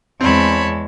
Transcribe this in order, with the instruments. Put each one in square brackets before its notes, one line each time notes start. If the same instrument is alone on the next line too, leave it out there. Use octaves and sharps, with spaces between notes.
[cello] E2 G#3 [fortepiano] C4 [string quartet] C#5 A5 B5